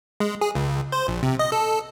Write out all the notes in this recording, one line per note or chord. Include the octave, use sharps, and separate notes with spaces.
G#3
G#4
C#2
C5
A#1
C3
D#5
A4